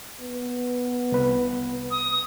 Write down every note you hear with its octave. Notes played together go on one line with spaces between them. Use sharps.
B3
C2 B4
D#6